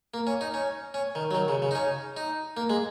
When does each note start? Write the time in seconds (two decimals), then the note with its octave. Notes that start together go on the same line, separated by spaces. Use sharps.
0.14 A#3
0.27 C#4
0.41 D#4
0.54 C#4
0.94 C#4
1.15 D#3
1.31 F#3
1.35 D#3
1.48 C#3
1.62 C#3
1.71 D#4
1.75 C#4
2.17 D#4
2.57 A#3
2.70 G#3